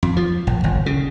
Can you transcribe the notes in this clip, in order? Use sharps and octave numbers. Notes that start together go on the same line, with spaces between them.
F2
F3
A#1
G1
C#3